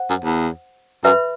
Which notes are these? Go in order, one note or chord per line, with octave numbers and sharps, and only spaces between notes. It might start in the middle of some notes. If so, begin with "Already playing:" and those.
Already playing: C5 F#5
F#2
E2
F#2 B4 E5 B5